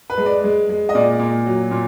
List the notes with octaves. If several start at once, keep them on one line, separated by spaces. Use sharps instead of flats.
B4
G#3
D5
G#3
G#3
D#5
A#2 D5
A#2
F#3
A#2